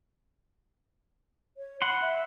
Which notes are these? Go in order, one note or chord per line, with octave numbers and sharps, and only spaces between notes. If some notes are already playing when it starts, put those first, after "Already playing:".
C#5
F#5 B5 C6
E5